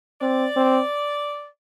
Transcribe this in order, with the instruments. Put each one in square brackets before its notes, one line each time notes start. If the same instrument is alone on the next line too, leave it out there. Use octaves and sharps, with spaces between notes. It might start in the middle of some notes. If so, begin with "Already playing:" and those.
[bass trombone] C4 [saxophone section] D5
[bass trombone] C4